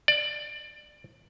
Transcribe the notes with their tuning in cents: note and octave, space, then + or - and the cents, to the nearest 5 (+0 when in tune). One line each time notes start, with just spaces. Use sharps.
D5 +20